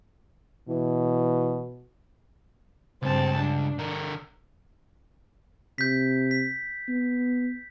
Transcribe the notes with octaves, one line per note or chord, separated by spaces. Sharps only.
B2 E3
C#2 G2 C4 A5
D4
D3 A#4
C3 G6 B6
B6
B3